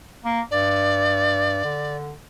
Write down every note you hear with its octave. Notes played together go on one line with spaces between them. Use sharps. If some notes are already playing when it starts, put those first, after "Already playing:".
A#3
G2 D5
D3